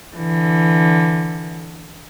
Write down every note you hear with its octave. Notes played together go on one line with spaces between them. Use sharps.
D3 E3